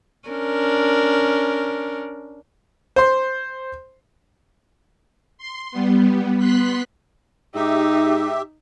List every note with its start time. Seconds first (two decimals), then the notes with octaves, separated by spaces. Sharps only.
0.28 C#4 D4 A#4
2.96 C5 C6
5.38 C6
5.71 G3 B3
6.37 B3 C6 F#6 B6
7.55 G#2 D#4 G4 E5